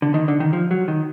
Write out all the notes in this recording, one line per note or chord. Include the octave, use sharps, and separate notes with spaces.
D3
D#3
D3
D#3
F3
F#3
D#3